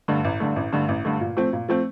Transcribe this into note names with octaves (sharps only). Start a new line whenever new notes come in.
G2 D3 A3
A1
G2 D3 A3
A1
G2 D3 A3
A1
G2 D3 A3
A#2
F3 A3 C4
A#2
F3 A3 C4